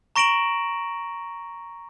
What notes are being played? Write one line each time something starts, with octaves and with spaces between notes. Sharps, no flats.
A#5 C#6 A#6 D7 E7 F#7